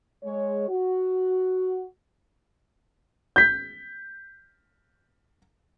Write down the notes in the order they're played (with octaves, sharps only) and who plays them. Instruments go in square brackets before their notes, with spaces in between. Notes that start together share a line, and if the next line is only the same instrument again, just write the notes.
[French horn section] G#3 C#5
F#4
[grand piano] G6 B6